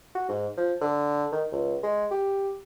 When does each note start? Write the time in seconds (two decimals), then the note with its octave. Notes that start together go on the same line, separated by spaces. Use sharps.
0.15 F#4
0.29 G#2
0.57 F3
0.81 D3
1.32 D#3
1.52 C#2
1.83 G#3
2.11 G4